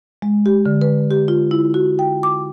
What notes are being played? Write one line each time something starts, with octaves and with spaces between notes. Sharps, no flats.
G#3
G4
D3
B4
G4
F4
E4
F#4
G5
D6